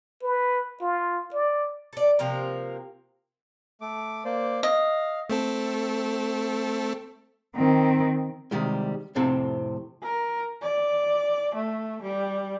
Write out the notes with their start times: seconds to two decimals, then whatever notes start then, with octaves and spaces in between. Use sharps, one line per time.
0.23 B4
0.81 F4
1.34 D5
1.93 A4 D5
2.19 C3 F3 A#3 A#4
3.81 A3 D6
4.25 A#3 C5 D5
4.63 D#5 F5
5.30 A3 C4 A4
7.56 D#3 C4
8.51 C3 D#3 G3 G#3
9.15 F2 A2 C3 C4 A4
10.03 A#4
10.62 D5
11.55 A3
12.03 G3